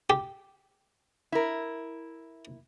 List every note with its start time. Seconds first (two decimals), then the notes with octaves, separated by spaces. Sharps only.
0.10 G4
1.32 E4 A#4